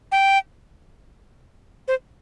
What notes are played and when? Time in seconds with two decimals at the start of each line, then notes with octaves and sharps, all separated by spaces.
0.12 G5
1.88 C5